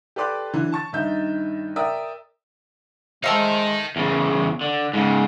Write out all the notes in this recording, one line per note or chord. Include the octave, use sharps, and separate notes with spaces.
G4 A4 B4 D5 C6 D6
D3 E3 F#3
A5 C#6 A6
G2 D#3 D#4 E5 G6
A#4 D5 E5 G5 D#6 E6
G#3 A3 D#4 A#4 C5 E5 F5
E2 C#3
D3
G#2 C#3